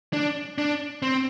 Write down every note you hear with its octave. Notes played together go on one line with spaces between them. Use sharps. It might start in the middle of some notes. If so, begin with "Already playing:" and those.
D4
D4
C4